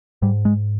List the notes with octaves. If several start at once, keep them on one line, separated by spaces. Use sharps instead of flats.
G#2 G3
G#3